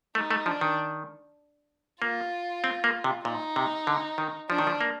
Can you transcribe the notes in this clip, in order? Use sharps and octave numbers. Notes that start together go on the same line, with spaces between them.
A3 D#4
A3
F3 D4
D#3
A#3 F4
C4
A#3
C3
A#2 D#4
C3
D3
D#3
F3 D4
D#3
F3
A#3